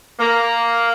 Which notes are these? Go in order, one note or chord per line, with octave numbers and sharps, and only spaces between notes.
A#3